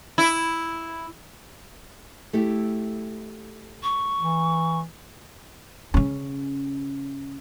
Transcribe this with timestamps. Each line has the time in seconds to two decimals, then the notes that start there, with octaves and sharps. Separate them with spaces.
0.18 E4
2.33 A3 E4 G4
3.83 C#6
4.19 E3
5.94 C#3 C#4